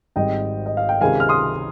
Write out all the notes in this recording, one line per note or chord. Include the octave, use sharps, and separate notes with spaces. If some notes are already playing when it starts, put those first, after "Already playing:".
G#1 G#2 G3 C4 D#5 G5
D#5
F5
G5
C#2 C3 D#3 F5 G#5
F6
C6 D#6